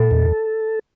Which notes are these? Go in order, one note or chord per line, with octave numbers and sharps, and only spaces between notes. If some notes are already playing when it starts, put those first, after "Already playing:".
Already playing: A#2 A4
E2